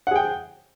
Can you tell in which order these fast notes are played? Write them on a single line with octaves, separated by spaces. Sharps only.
F#5 G#4 G5